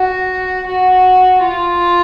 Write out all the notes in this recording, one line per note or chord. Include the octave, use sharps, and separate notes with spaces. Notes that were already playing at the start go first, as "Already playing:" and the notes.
Already playing: F#4
F#4
F4